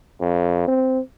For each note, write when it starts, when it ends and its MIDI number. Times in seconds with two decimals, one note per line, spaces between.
0.21 0.65 41
0.68 1.00 60